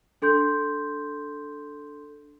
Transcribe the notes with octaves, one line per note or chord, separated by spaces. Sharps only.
D4 A4 C6 G6